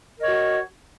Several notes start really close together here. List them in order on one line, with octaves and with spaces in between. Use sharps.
A#4 D#5 C#5 F#4